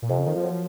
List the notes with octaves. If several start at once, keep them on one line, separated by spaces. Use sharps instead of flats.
A#2
F2 C3
C#3
D#3 A#3
F3
F#3